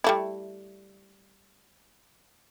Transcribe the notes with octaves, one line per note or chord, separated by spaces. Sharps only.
G3 A3 E4